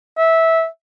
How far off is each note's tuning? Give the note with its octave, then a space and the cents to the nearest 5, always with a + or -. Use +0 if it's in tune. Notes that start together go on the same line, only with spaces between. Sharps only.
E5 -15